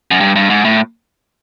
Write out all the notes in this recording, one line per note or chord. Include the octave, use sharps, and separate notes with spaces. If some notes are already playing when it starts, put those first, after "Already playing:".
F#2
G2
G2
G#2
A2